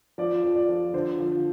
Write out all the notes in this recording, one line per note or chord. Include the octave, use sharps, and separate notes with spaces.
F3 D5
F2
D5
F3
D3 C5
F3